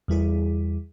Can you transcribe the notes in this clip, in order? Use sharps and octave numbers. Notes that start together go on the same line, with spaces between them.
E2 G3 E4 G#4